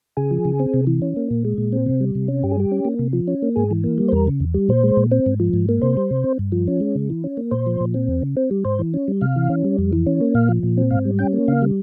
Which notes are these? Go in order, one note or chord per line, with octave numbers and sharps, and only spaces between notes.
C#3 G#4
F3
C#3
C4
C3
E3
C#4
A#3
A#2
G#3
A#2
C4
C3
G3
C3
C#4
G2 G4
G#4
G3 G4
C#4
A#3
C3
F3
C#4
A#3
G#2 G#4
E3
A#3
G3
C5
E2 A#4
C#3
E2
G3
A#2 C5
G#3
A#2
C4
G#2
F3
G#2
A#3
C3 C5
G3
C3
C4
G2
F3
C#4
G#3
C#3
E3
C#4
A#3
A#2 C5
F3
A#2
C4
E2
C#3
C4
G3
G#2 C5
E3
C#4
G3
C3 F5
E3
C#4
G3
F2
E3
C#4
A#3
A#2 F5
F3
A#2
C4
G#2 F5
G3
C#4 G5
A#3
C#3 F5
G3